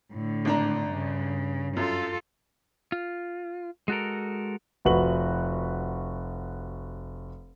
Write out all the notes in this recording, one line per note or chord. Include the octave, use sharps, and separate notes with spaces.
A2 D3
G#1 D4 A#5
G2 C#3
F#2 F4 A4
F4
G#3 F#4 A4 A#4
F1 F#4 B4 F#7